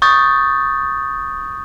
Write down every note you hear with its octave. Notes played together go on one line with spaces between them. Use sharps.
C#6 D#6 G6 A6